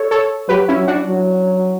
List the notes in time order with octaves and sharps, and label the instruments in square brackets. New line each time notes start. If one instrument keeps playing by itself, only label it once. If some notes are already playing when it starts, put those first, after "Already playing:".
Already playing: [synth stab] A4 C#5
A4 C#5
[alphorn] F#3 [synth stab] G4 B4
[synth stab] C#4 E4
[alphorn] F#3
[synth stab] D4 F#4
[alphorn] F#3